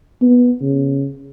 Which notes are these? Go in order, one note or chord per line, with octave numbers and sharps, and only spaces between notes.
B3
C#3